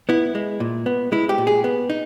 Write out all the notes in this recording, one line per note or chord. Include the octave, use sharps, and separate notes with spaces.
B3 E4
G#3
A#2
B3
G#3 E4
G4
A#2
G#4
B3
D#4